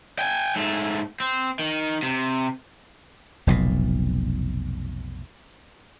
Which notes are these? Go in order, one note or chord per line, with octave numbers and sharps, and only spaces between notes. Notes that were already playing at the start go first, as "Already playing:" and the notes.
G5 G#5
G#2 A3
C4
D#3
C3
F1 B1 A#2